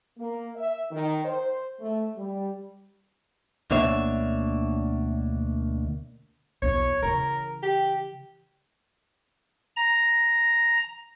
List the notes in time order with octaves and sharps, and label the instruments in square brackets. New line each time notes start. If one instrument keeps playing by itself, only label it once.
[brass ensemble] A#3
E5
D#3
C5
A3
G3
[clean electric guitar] D2 B2 A#3 D4 C#5 E5
[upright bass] B1 E2 [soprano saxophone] C#5
[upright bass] C#3 E3 [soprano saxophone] A#4
[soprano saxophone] G4
[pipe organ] A#5